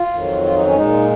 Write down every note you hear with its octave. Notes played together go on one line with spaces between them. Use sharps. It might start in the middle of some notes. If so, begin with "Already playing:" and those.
Already playing: F4
F2 D#3 F#3
F4
D#4
C#4
A#2 G#3 D#4